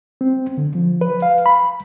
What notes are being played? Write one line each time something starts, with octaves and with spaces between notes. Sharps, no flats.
C4
D3
F3
B4
F5
B5